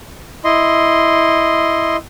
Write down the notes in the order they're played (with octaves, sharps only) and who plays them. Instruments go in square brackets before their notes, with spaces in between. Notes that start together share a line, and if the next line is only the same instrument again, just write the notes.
[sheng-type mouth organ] E4 D#5 C6